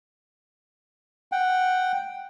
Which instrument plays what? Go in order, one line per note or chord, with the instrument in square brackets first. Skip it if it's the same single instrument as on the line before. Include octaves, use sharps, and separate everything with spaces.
[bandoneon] F#5 G5